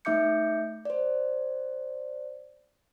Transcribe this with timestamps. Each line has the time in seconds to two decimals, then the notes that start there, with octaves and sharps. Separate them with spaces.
0.05 A3 D#4 E5 D6 G6 C#7
0.85 C5 D5